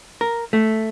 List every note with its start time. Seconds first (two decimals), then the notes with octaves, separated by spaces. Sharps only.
0.21 A#4
0.53 A3